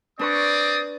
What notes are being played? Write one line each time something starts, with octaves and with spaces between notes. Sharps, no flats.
C4 D4 B4 D5 C#6 D#6